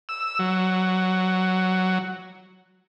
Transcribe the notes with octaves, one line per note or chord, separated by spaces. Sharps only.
E6
F#3